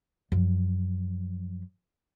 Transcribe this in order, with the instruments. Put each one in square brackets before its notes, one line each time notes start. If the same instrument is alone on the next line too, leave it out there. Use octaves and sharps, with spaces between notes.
[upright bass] F#2 F3